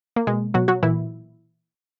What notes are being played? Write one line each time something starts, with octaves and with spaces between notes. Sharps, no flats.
A#3
B2 G#3
B2 F#3 F#4
F#3 F#4
A#2 E3 E4